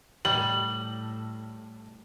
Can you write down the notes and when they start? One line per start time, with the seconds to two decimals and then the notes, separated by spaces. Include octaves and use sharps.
0.25 A2 G3 F#7